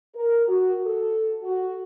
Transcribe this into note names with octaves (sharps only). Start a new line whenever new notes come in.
A#4
F#4
A4
F#4